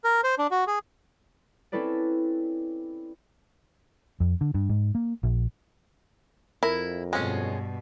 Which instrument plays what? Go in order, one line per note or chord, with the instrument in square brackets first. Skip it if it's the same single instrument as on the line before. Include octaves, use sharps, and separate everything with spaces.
[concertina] A#4
C5
D4
F#4
G#4
[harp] C4 C#4 E4 A4 B4 D5
[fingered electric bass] F2
D3
G2
G#2
A#3
A#1
[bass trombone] F2 [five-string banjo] E4 [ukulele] A#4
[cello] G2 B2 [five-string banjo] G#3 C#4